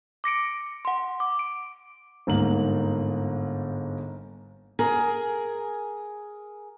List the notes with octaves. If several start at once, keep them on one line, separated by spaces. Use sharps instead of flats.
D6 A#6 C#7 D7
F#5 C6
D6
D7
G1 G#2 A#3 F#7
G#4 A#4